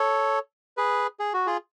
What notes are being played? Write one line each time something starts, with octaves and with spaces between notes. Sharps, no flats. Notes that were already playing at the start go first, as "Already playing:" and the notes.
Already playing: A4 C#5
G#4 B4
G#4
F#4
F4 G#4